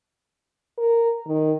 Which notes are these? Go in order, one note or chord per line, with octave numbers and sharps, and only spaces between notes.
A#4
D#3